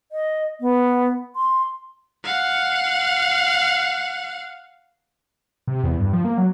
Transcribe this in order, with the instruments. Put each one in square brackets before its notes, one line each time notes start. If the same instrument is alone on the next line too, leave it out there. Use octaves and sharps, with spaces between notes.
[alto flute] D#5
B3
C6
[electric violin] F5 F#5
[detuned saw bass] C3
E2
G2
F3
A#3
F#3